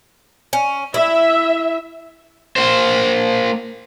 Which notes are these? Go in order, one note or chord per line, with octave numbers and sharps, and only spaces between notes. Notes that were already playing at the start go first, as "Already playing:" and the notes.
C#4
E4 E5
A#3 C5